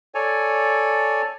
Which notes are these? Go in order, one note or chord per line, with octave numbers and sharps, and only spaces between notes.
A4 C#5 D5 G#5